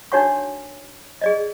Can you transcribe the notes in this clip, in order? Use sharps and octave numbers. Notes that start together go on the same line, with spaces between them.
D4 D#4 F#4 C#5 F#5 C#6
G#4 D5 D#5